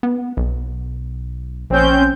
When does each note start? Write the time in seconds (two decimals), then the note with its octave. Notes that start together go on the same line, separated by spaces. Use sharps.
0.03 B3
0.37 B1
1.70 A#1 C4 C#4 G6